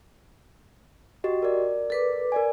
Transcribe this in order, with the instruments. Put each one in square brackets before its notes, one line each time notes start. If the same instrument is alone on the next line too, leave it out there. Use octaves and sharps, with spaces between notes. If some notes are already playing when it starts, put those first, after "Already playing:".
[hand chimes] F#4 G4 D#5
A#4 D5
[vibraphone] A4 B4 D6
[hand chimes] A#4 D5 G#5